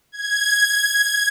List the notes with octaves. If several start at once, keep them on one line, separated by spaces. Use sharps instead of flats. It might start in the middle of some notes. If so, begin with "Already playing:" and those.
G#6